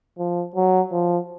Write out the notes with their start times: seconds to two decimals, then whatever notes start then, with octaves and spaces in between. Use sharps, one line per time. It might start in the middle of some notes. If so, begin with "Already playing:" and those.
0.18 F3
0.55 F#3
0.92 F3